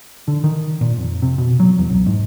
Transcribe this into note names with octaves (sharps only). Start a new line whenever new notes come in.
D3
D#3
A#2
F2
C3
B2
F#3
E2
C2
G#2